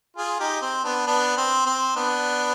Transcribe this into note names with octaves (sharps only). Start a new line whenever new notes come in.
F4 G#4
D#4 G4
C4
B3 D4
B3 D4
C4
C4
B3 D4